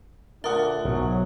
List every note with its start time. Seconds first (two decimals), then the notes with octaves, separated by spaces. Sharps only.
0.44 D2 A#2 D3 A#4 E5 F#5 D#6
0.85 B1 G#2 F#3